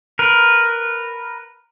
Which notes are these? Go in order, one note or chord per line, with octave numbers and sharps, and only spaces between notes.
A#4 B4